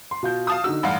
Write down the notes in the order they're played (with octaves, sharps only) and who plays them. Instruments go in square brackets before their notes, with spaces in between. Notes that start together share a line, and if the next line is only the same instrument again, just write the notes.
[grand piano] C6
B2 F4 G6
[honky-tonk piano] F5 A5 D#6
[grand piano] D3 D#4 F#4 [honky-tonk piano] E6
[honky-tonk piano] A1 G2 F5 [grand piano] F#5